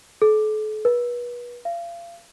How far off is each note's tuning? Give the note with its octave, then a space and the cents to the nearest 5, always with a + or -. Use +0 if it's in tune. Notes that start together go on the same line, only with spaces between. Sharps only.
A4 -40
B4 -30
F5 -35